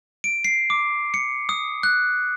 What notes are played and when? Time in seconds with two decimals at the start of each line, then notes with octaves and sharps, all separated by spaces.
0.24 D7
0.45 C7
0.70 D6
1.14 C#7
1.49 D#6
1.83 F#6